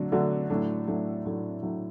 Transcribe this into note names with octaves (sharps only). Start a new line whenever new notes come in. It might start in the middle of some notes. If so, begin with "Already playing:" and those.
Already playing: D3 F#3 A3 D4 F#4
D3 F#3 A3 D4 F#4
A2 F#3 A3 D4
A2 F#3 A3 D4
A2 F#3 A3 D4
A2 F#3 A3 D4